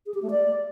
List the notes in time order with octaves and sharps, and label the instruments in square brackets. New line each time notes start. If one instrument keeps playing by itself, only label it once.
[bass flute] G#4
G4
A3
D5